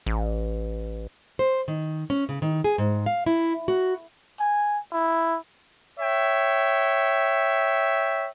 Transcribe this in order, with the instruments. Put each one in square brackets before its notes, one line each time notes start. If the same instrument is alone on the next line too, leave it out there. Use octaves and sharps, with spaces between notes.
[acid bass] A1
[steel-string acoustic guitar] C5
D#3
C#4
C#3
D#3
G#4
G#2
F5
E4
F#4
[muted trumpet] G#5
E4
[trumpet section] C#5 E5 G5